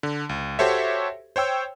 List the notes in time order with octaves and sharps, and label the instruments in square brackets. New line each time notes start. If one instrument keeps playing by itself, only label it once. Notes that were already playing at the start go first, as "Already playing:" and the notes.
[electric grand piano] D3
C#2
F#4 G4 A4 C5 C#5 E5
C5 C#5 G5 E6